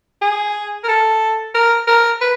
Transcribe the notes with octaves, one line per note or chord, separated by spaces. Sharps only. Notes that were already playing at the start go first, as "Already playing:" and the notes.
G#4
A#4
A4
A#4
A#4
B4